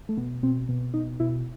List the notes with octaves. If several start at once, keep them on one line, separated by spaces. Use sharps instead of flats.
A3
B2 B3
B2 C4
B2
B2 D#4
B2 E4